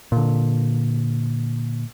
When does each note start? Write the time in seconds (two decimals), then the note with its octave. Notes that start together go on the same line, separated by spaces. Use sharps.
0.12 A#2 D3